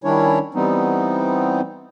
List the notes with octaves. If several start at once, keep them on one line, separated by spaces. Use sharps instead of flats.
D#3 G3 C#4 D4 E4 C#5
E3 G3 B3 C4 D#4